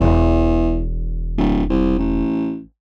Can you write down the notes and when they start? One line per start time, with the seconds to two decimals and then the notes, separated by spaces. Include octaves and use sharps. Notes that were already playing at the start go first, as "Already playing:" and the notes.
0.01 E1 E2
1.38 D1
1.70 C2
1.99 A1